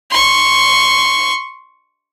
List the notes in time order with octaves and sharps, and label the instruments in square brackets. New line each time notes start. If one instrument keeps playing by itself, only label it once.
[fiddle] C6 C#6